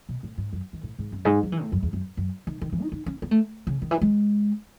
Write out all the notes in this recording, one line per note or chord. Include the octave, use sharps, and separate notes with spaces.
B2
A2
G#2
F#2
D#3
A2
G#2
F#2
G#2
F#3
E3
A2
F#2
E2
F#2
F#2
D#3
D#3
E3
D#4
D#4
C#4
B3
A3
C#3
D#3
E3
G#3